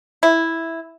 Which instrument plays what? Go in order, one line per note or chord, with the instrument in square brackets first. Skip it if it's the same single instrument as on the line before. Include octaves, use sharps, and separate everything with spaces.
[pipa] E4